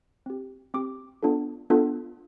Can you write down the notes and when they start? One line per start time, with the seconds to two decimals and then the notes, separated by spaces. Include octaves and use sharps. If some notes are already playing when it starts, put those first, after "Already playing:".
0.26 C4 G4
0.74 C4 G4 D6
1.23 B3 D4 F4 A4
1.70 B3 D4 F4 A4